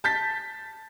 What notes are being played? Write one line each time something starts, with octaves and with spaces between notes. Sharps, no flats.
A5 G6 A6 B6